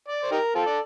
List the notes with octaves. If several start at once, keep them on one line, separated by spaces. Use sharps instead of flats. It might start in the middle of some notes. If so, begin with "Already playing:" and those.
D5
C5
D#4 G4 A#4
C4 F4 A4
D5